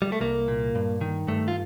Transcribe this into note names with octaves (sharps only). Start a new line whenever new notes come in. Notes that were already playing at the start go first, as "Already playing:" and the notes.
G3
A3
C2 A#3
A#2
G2
D#3
G2 A3
F4